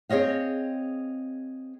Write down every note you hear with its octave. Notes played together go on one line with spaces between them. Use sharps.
C4 G#4 C#5 D#5 F5